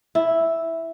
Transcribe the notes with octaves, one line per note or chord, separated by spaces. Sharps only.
E4